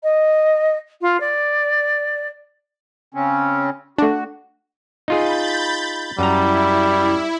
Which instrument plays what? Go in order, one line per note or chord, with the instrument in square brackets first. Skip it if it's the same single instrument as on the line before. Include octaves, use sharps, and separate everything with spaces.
[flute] D#5
F4
D5
[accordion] C#3 C4 C#4
[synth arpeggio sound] A3 D4 [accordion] F#4
[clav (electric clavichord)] D#4 F4 G#4 [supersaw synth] B5 G6 A6
[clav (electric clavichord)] F#2 A#5 [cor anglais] G3 [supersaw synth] E4